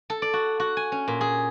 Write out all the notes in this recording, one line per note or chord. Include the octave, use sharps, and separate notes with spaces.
A4
D5
F#4
F#4
G#5
C#4
A#2
G#4